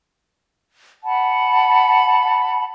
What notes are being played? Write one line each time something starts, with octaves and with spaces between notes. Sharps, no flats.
F#5 A5 B5